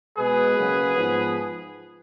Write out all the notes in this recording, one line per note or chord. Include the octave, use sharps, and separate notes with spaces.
B2 G#3 B3 G#4 B4
C#3 F#3 A#3
G#2 F3 B3